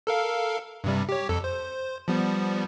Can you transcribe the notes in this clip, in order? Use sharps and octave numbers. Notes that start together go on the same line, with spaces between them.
A4 A#4 F5
G2 C3 G3
G4 C#5
F2 A4
C5
F3 G3 B3